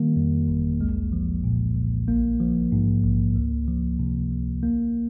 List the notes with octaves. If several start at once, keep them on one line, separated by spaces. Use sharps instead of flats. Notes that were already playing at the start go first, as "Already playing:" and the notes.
Already playing: D#3 G3 A#3
F2
G1
C2 G#3
F3
A#2
C2
A#1 A#3
F3
G#2
A#1
C#2
F3
C3
C#2
A#1 A#3